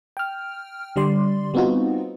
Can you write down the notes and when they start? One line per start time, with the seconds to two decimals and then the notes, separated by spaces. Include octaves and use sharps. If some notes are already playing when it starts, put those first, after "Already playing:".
0.17 G5 F6
0.96 D3 G3 D5 C6
1.54 G3 B3 C4 D#4 F4 F#4